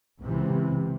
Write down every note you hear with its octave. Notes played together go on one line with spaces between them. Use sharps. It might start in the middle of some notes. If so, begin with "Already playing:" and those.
C#2 C3 E3